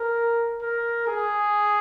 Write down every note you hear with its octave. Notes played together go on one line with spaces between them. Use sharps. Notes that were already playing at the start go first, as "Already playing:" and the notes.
Already playing: A#4
A#4
G#4